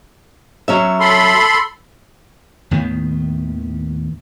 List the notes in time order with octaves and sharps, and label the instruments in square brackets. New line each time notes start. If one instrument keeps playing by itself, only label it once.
[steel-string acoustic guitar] F#3 C#4 E5
[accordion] A4 B5 C6
[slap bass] D#2 A2 D#3 B3